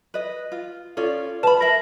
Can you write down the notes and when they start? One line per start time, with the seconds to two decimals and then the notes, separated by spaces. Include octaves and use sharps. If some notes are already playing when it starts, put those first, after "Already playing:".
0.14 B4 D#5
0.52 F4
0.97 C#4 F4 A4 D5
1.43 B4 A5 B5
1.61 A#4 E5 A#6 F#7